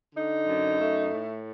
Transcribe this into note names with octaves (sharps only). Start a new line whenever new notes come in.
D3 D#4
F#2
A3
A2